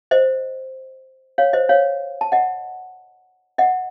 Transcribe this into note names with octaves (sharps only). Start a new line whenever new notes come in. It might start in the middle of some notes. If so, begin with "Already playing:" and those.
C5 D#5
C#5 F5
C5 D#5
C#5 F5
A5
D#5 F#5
D#5 F#5